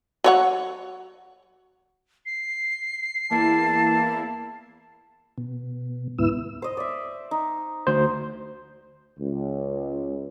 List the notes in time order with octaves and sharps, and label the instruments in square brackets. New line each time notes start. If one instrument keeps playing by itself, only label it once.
[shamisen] F#3 C#5 F#5
[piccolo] C7
[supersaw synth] E2 A#3 E4 [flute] A5
[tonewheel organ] B2
D2 G#2 B3 E4 E6
[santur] C5 D#5
D5 E5
D#4
[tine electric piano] D2 C5
[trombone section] C#2